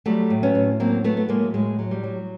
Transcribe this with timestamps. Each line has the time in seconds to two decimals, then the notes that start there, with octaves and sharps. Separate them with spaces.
0.06 F#3 G3 A3
0.30 A2
0.43 B3 C#4
0.55 A2
0.80 F#3 A#3 C4
1.04 F#3 A3 B3
1.17 B3
1.29 A2 G#3 A#3
1.54 A2 G#3
1.79 F#3
1.91 G3
2.03 F#3